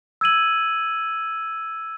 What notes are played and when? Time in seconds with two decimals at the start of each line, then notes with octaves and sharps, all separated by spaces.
0.21 E6 G#6 D#7 F#7